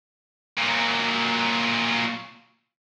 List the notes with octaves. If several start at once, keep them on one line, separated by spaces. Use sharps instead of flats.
A#2 F#3